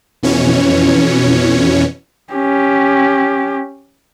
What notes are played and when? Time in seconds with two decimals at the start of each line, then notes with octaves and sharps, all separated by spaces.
0.23 F2 B2 E3 C#4 C#5
2.33 C#4 G4